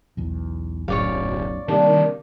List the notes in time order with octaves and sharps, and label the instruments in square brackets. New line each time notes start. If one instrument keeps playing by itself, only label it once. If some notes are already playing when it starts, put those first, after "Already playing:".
[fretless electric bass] B1 E2
[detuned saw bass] D1 [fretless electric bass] B1 F#2 [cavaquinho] C#5 D5 F5
[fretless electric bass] C3 [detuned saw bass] D#3 [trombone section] G3 A#3 D4